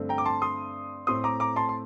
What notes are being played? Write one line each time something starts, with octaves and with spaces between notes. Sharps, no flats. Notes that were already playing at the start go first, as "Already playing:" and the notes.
Already playing: G2 D3 A3 C4
G5 A#5
D6
A5 C6
C6 D#6
A2 A3 C4 C6 D#6
A#5 D6
A#5 D6
A5 C6
C6